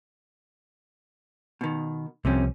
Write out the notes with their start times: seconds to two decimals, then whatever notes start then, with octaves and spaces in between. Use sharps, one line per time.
1.61 B2 D#3
2.25 C2 C3 F3 C4 C#4